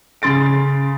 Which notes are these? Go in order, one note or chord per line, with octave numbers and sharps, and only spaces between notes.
C#3 C6 A6 D7